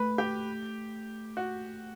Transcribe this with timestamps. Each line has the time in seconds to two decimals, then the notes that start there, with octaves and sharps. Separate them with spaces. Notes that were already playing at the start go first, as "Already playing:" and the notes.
Already playing: A3 B4
0.18 G4
1.37 F#4